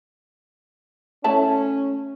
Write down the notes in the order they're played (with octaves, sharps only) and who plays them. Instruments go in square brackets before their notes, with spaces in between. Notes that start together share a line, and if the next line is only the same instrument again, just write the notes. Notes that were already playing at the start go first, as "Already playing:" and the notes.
[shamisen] A3 E4 A5 [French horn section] C#4